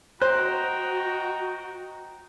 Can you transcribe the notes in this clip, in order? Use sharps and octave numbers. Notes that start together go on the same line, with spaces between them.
F#4 C5 D#5 G5 A#5 F#6